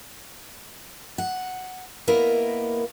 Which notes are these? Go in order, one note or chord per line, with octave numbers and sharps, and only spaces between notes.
F#5
A#3 B3 E4 A#4 D#5